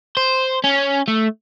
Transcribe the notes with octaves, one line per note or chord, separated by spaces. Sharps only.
C5
C#4
A3